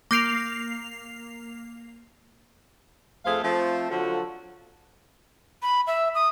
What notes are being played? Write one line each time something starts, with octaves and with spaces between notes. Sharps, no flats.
A#3 D6 G6 C7 D7 F7
F2 A3 G#4 C5 F5
F3 A3 C4
D3 F3 F#3 F4 F#4 A4
B5
E5
D#6